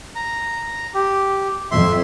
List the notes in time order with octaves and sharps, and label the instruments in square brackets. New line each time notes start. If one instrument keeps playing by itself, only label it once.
[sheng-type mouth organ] A#5
G4
[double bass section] F2 [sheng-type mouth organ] E5 C6